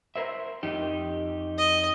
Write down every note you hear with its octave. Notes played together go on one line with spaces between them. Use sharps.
A#4 C5 E5
F2 D#4 G4
D#5